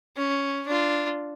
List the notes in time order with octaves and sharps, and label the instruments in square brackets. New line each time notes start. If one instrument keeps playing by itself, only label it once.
[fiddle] C#4
D4 F4